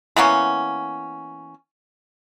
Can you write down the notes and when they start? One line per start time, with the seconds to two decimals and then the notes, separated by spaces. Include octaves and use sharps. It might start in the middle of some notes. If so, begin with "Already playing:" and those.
0.16 E3 A#3 B3 C#4